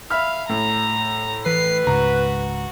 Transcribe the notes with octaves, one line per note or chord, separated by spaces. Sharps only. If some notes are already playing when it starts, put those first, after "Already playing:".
E5 F5 B5 F6
A2 A#5
E3 B4 C7
C#2 G#2 C#3 F#4 A#5